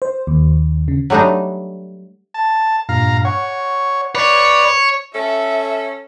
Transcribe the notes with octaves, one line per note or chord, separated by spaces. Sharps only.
C5
D#2
C#3
F#3 G3 A3 D4 D#4
A5
G2 A#2 F5 A#5
C#5 F#5 C#6
B4 C#5 D5
C#4 A4 E5